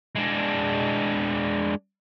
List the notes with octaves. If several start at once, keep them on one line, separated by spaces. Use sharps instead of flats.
G#3 D4